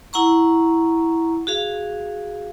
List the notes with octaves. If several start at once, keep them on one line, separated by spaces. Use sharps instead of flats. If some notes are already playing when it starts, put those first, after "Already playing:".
E4 F#5 A#5 C#6
F#4 G#4 F5